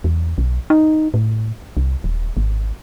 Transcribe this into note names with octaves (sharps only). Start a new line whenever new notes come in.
E2
B1
D#4
A2
C2
D#1
G#1